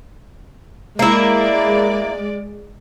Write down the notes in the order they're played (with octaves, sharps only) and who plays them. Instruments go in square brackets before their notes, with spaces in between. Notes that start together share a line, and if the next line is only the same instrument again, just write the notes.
[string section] G#3 D5 [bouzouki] A#3 E4